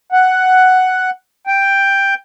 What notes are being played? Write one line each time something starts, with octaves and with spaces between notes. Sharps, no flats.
F#5
G5